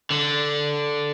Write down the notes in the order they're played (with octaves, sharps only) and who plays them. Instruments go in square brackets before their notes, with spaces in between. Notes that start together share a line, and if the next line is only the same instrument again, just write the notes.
[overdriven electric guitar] D3